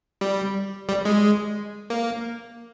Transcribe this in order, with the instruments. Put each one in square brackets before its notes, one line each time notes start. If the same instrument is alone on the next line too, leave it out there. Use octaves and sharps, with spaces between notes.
[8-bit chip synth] G3
G3
G#3
A#3